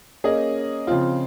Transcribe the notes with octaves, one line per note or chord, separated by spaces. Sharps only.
A#3 C#4 G#4 D#5
C#3 F3 C4 F4